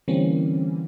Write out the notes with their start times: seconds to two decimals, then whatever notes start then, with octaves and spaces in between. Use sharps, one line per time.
0.08 D3 E3 G3 A#3 C4 C#4